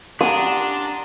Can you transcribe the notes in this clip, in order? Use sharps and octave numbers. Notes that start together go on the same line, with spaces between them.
C#4 D4 G4 F#5 A#5 C6 D#6